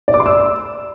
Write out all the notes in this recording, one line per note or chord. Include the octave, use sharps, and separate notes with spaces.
D5
D6
C6
E6